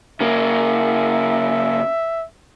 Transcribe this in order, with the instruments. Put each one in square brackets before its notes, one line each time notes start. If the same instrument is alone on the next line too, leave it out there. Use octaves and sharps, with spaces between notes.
[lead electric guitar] C#3 A#3 [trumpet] E5